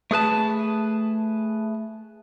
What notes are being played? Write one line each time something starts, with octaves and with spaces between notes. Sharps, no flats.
A3 G#4 B4 A5